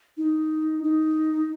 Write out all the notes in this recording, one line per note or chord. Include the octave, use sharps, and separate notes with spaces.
D#4
D#4